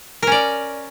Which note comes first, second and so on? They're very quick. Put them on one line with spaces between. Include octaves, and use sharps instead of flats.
A#4 C#4 D5